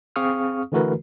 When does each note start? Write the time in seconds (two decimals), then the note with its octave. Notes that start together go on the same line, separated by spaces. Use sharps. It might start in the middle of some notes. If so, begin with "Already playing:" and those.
0.16 C4 G#4 F5 C#6 D#6 F6
0.72 D3 E3 A3 F#4 A#4 B4